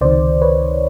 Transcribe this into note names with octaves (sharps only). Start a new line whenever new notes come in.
C#2 C3 D#3 C5 D5
B4 C#5